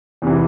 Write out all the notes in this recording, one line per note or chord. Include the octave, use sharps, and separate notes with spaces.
E2 C3 E3